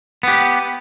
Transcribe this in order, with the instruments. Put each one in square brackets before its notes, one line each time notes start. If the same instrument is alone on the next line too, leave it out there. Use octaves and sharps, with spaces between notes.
[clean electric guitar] B3 G4